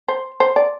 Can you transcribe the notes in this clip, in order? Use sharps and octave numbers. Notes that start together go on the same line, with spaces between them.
C5
C5
D5